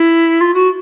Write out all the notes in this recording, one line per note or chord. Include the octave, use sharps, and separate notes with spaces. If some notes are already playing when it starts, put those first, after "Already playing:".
Already playing: E4
F4
F#4